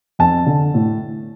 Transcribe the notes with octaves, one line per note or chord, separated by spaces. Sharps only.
F2 A5
D3
A2